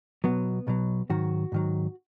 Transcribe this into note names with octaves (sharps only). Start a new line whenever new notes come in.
B1 B2 F#3 B3
B1 B2 F#3
G#2 D#3 F#3 F#4
G#2 D#3 F#3